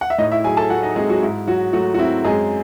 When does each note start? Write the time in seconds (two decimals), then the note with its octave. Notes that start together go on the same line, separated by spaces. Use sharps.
0.01 F#5
0.10 E5
0.18 A2 D#4 D#5
0.32 E4 E5
0.44 F#3 G#4 G#5
0.57 A4 A5
0.70 A3 F#4 F#5
0.83 D#4 D#5
0.96 G#3 C4 G#4
1.09 F#3 F#4
1.22 G#2 E4
1.47 F#3 F#4
1.73 F#3 A3 F#4
1.94 F#4
1.99 C4 E4
2.25 F#2 G#3 G#4